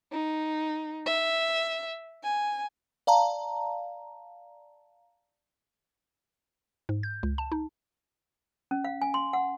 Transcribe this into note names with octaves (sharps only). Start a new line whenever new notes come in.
D#4
E5
G#5
D5 F5 A5 A#5
G#2
G6
C#2
A5
D#4
C#4
F5
G#5
C6
F#5